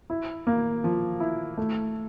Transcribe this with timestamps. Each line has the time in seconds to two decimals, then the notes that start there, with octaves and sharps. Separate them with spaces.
0.10 E4
0.47 A#3
0.84 F3
1.20 E4
1.58 A3